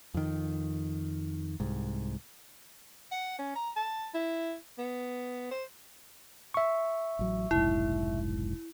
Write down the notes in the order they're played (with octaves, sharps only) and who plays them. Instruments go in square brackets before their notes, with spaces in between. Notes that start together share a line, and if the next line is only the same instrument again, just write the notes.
[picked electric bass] F2 D#3
C2 G#2
[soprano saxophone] F#5
C#4
A#5
A5
E4
B3
C5
[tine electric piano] E5 C#6
[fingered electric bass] A1 F#3
[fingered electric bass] F1 B1 G#2 [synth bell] E4